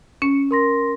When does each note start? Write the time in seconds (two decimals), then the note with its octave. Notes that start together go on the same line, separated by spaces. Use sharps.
0.22 C#4 C#7
0.51 A#4 C6 A#6